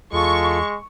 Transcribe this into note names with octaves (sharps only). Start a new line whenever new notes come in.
E2 G#3 F4 A4 C#6